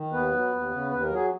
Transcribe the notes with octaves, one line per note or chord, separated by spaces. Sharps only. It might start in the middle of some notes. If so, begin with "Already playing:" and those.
Already playing: D#3
D#2 B3 B4
F#3
D#2
C#3
D#2 B4
A#4
F#3 G#4